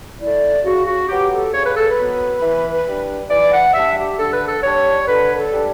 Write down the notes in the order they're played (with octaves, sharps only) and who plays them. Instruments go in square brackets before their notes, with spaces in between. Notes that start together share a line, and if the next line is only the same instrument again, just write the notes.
[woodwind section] A3 E4 D5
C#3 F#4
F#4
F#3 B3 G4
A4
C#3 C#5
B4
A4
B4
F#3 B3
E3
G3 D4
E3 D5
F#5
G3 D4 E5
G4
D3 A4
B4
A4
G3 D4 C#5
D3 B4
A4
G3 D4